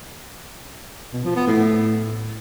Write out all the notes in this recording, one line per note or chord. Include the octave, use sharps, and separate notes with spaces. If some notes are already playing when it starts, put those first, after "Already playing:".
B2
F3
B3
A2